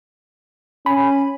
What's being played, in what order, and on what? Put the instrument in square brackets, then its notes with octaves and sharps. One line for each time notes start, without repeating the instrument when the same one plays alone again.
[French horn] C#4 [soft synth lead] G#5 [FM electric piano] B5